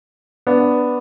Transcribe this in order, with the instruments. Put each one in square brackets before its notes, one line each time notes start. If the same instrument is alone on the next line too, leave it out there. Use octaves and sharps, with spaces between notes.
[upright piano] B3 D4